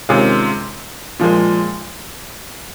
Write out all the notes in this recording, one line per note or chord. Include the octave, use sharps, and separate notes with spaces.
C3 D#3 G#3 C#4 F4
A#2 F3 G#3